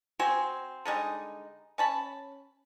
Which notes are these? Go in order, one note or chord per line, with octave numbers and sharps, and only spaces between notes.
C4 F#4 C5 G#5
D3 G3 G#3 D#4
C#4 A5 B5